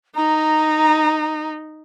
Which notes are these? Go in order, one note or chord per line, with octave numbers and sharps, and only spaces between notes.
D#4 A#5